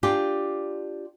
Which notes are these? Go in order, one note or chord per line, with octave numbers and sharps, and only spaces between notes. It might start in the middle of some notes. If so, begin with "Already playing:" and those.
D4 F4 G4